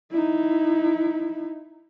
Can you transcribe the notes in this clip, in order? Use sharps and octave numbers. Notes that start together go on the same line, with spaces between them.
D#4 E4